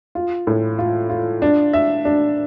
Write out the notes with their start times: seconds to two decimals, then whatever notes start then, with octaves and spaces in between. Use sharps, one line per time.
0.15 F4
0.47 A2
0.79 F4
1.10 F4
1.42 D4
1.73 E5
2.05 D4